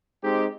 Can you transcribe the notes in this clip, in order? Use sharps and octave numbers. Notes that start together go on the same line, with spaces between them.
G#3 C4 D#4 G4